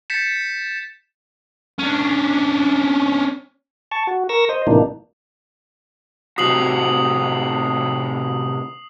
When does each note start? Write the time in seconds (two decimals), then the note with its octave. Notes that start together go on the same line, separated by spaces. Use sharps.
0.10 G6 A6 B6 C#7 E7
1.79 C#4 D4
3.92 A5 C#6
4.07 F#4
4.29 A#4 C#6 E6 A#6
4.49 C5 D#5
4.67 A2 C3 E3 A#3 D4 D#4
6.38 A2 C3 F#4 D#6 C7 F#7